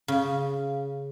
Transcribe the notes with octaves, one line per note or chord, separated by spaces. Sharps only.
C#3